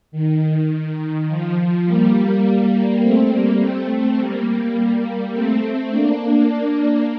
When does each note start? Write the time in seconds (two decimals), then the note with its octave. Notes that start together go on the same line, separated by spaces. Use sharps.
0.12 D#3
1.28 F3
1.85 G3 A#3
3.01 A3 C4
3.30 G3 A#3
3.59 A3 C4
4.17 G3 A#3
5.33 A3 C4
5.91 A#3 D4